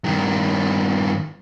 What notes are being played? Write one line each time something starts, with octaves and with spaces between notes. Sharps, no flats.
G2 D#3